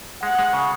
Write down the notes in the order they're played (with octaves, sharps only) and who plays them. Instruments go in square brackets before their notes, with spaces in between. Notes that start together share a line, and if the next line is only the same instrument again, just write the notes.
[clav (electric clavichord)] G#3 [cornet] F#5
[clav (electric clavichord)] G#3
C#3